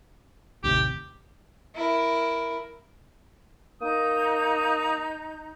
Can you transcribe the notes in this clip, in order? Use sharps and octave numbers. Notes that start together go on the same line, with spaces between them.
A1 D#2 C3 G4
E4 A#4
A#3 D#4 D#6 G6